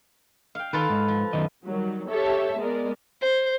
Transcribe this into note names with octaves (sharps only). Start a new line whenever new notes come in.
F5 G5
D#3 F4 A4 B4
G#2
F3
F#2 D#3 D#5
D#3 F#3 G3
G4 A4 C#5 E5 A5
G#3 B3 A#4 D5
C5